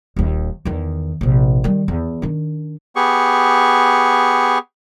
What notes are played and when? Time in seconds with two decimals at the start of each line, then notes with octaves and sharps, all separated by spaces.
0.16 D#1 D#2
0.65 E2 D#3
1.21 A#1 C3
1.64 D#3 G3
1.88 E2
2.22 D#3 D4
2.96 B3 G4 G#4 C#6